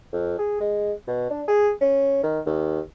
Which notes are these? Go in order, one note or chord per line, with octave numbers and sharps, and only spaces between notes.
F2
G#4
G#3
B2
D4
G#4
C#4
D#3
D#2